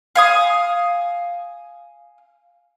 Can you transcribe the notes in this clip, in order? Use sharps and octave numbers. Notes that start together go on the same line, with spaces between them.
F5 G#5 D#6